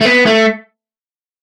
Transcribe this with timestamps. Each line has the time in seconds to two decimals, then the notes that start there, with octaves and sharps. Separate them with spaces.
0.01 A3
0.05 B3
0.26 A3